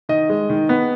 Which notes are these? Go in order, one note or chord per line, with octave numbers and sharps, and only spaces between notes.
D#3 D#5
G#3
D#3
B3